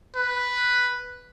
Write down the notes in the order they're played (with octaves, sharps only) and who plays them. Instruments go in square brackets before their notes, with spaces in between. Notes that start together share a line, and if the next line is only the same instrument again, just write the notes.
[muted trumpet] B4